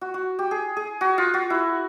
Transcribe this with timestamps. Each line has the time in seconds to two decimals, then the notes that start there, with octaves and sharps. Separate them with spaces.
0.01 F#4
0.14 F#4
0.39 G4
0.51 G#4
0.77 G#4
1.01 F#4
1.18 F4
1.34 F#4
1.50 E4